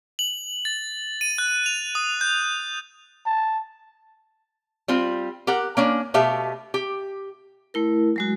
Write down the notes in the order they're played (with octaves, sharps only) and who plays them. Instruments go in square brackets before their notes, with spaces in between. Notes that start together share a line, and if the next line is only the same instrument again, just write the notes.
[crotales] F#7
A6
D#7
F#6
F7
D#6
G6
[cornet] A5
[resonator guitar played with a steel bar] G3 C4 F4
G4 A#4 F#5
A#3 C#4 D4
B2 A3 G4 E5 F5
G4
[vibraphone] A3 E4 A#4
F#3 G#3 F#4